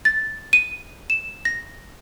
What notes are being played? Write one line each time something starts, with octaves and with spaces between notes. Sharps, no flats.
A6
D#7
E7
A#6